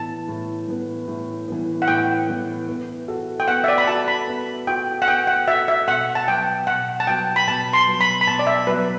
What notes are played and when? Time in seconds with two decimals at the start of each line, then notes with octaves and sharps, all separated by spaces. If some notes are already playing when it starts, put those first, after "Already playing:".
Already playing: A2 E3 B3 A5
0.28 A2
0.68 E3 B3
1.08 A2
1.48 E3 B3
1.82 F#5
1.88 A2 G5
2.28 E3 B3
2.68 B3
3.08 F#4 A4
3.40 G5
3.48 B3 F#5
3.64 E5
3.68 D5
3.78 B5
3.87 F#4 A4 A5
4.08 B5
4.28 B3
4.67 F#4 A4 G5
5.02 F#5
5.08 B3 G5
5.27 F#5
5.47 F#4 E5
5.52 A4
5.68 E5
5.87 B2 F#5
6.15 A5
6.27 F#3 B3 G5
6.67 B2 F#5
7.00 A5
7.07 F#3 B3 G5
7.36 B5
7.47 B2 A5
7.73 C6
7.87 F#3 B3
8.01 B5
8.21 B5
8.27 B2 A5
8.39 D5
8.47 E5
8.67 F#3 B3 B4